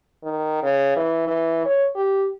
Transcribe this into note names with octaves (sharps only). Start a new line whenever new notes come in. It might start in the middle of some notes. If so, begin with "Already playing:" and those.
D#3
C#3
E3
E3
C#5
G4